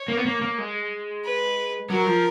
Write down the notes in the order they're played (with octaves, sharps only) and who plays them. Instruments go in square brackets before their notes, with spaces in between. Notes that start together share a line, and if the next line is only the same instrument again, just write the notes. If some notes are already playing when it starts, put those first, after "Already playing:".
Already playing: [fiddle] C#5
[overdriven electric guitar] A#3
B3
A#3
A#3
G#3
[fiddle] B4
[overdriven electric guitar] F#3 [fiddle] A#4
[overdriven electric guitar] F3